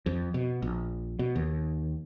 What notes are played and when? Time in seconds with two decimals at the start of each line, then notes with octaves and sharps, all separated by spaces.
0.06 F2
0.34 B2
0.62 A#1
1.19 B2
1.36 D#2